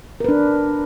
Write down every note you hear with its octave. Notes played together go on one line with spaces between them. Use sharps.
D4 A#4 B4